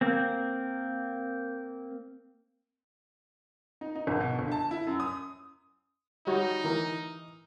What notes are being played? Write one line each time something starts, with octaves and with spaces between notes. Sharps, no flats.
A#3 C4
D#4
D#4
G#1
B2
G1
A5
E4
F#2
D#6
G3 D#4 F#4 C#5
E3 A#4 A#5